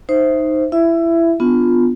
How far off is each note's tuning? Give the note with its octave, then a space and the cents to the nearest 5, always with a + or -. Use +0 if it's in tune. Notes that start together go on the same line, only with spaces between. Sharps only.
D#4 +0 C5 +0 E5 +0
E4 +20 E5 +15
B3 +15 D4 +10 F4 +5